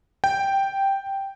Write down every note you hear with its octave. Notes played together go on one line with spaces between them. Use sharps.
G5